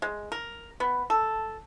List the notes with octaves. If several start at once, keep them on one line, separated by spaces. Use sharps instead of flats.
G#3
A#4
B3
A4